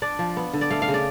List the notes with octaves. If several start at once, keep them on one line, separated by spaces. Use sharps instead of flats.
D4 D5
F3
B3
D3
D5
A3 F5
F5
C#3
D5